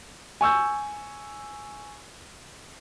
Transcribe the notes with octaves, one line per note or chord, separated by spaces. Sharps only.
G#5 C#6 E6 G6